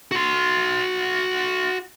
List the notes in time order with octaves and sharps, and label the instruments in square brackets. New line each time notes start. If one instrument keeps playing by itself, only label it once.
[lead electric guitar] F#4 C6